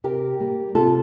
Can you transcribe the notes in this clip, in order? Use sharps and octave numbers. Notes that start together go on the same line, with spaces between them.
C3 G4 A#4
G3 A#3
C3 F4 A4